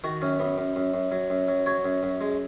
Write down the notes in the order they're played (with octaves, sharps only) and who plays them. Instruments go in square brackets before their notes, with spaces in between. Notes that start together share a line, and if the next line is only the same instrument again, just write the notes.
[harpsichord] D#3 F#4
F#2 C#4
F#2 B3
F#2
F#2
F#2
F#3
F#2
F#3
F#3 C#5
F#2
F#2
G#3